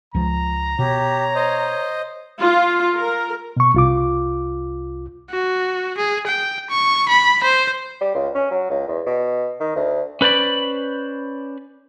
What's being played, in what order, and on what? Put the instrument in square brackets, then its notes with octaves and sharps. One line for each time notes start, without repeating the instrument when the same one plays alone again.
[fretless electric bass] C#2 F3 [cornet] A#5
[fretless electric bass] B2 [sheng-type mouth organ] G4 [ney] C#5
[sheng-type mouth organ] C5 D#5
[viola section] F4
A#4
[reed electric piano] B2 C#6
C2 F4 D6
[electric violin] F#4
G#4
G5
C#6
B5
C5
[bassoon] G3
C#2
C#4
F#3
C#2
E2
B2
D#3
D2
[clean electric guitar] C#4 B4 C5 D5 B5